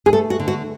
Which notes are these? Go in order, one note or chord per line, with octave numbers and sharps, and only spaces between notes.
G#4
A3 A4
F#4
D3
F#4